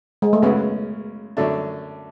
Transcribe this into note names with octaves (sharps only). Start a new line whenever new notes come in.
G#3
A3
F#2 C#3 G#3 B3
F#2 D3 A3 D4